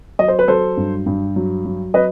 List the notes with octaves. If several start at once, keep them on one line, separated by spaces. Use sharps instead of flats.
F#3 D#5
C5
B4
F#3 A4 C5
G2
G2
F#3
F#3
F#3 B4 D#5